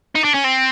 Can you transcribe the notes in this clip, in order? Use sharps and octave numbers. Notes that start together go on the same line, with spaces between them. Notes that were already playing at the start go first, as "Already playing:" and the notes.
D#4
D4
C#4
C4